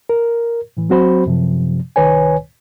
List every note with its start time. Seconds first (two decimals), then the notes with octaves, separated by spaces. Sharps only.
0.09 A#4
0.77 A2 E3
0.89 F#3 C4 F#4 C5 B5
1.26 F#2 C3 F3
1.96 C2 D#3 B4 C#5 G#5